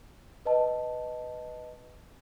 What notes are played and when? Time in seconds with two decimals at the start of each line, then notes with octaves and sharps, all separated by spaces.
0.45 B4 D#5 A5